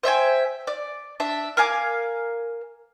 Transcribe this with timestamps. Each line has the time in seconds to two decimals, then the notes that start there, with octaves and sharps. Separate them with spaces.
0.03 C5 E5 G5 G#5
0.67 D5
1.20 D4 E5
1.57 A#4 F5 G#5 D6